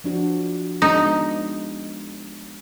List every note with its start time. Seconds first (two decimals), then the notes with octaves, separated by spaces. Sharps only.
0.04 F3 D4 F#4
0.82 G#3 B3 D4 D#4